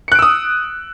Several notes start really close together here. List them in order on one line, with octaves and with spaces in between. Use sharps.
C#7 F#6 D7 E6 D#6